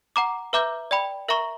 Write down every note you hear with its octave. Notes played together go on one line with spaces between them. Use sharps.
F#5 A#5 D6
B4 E5 A#5 D6 G6
D5 G5 B5
A#4 E5 A#5 C#6